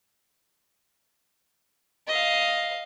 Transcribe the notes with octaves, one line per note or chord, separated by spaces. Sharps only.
D#5 F5